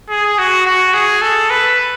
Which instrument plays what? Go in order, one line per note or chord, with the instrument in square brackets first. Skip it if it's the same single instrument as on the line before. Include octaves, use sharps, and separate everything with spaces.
[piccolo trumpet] G#4
F#4
F#4
G#4
A4
B4